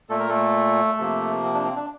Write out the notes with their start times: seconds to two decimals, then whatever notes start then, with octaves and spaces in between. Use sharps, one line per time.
0.09 A#2 A3 A4
0.20 A#4
0.29 A3 A4
0.99 C3 F3 A#3
1.43 C4
1.54 D4
1.65 C4
1.76 D4